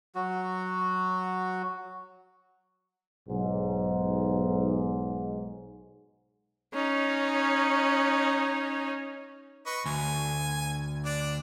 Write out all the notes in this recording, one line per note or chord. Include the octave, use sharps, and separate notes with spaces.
F#3 F#4
B1 G#2
C#4 D#4
B4 D#5 C#6
D2 G#5
D4 D5